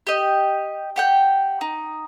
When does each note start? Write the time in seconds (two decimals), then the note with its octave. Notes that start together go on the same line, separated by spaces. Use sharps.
0.07 G4 D#5
0.96 G4 F#5 G5
1.61 D#4